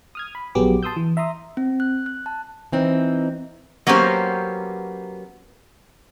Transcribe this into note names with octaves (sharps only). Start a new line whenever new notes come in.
D#6 F6 G#6
B5
A#1 F#3 B3 G4 G#4 D6
A5 C6 D#6 E6 G6
E3
E5 A#5 C6 D#6
C4
F#6
F#6
A5
E3 C4 D#4
F#3 A#3 B3 C#4 G4 C5